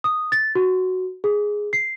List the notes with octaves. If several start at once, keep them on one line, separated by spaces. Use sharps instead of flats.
D#6
A6
F#4
G#4
C7